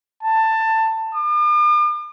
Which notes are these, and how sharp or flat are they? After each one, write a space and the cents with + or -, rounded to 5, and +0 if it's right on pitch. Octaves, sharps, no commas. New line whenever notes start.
A5 +15
D6 +45